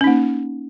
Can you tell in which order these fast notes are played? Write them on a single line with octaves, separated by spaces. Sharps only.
C#4 D#4 A#3